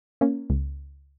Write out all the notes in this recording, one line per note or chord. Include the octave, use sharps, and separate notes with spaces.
A#3 C#4
C#2